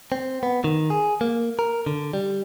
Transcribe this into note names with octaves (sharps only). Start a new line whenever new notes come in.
C4
B3
D#3
G#4
A#3
A#4
D3
G3